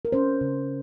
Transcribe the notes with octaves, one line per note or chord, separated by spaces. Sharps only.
A#4
C#4 C5
C#3